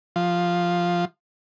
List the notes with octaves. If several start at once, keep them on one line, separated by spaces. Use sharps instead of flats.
F3